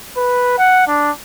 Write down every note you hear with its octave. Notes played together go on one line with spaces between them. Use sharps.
B4
F#5
D4